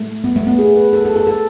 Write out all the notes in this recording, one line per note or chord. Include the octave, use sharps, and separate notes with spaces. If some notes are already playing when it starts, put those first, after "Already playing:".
Already playing: A3
B3
A3
B3
G#4
B4
A4
A4
A4
A4